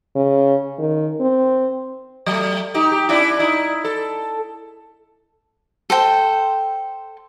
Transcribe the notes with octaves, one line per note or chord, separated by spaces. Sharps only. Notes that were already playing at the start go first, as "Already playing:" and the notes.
C#3
D#3
C4
F#3 A3
D#4 G4
G4
C#4 D4 E4
D#4 E4
A4
A4 C5 G5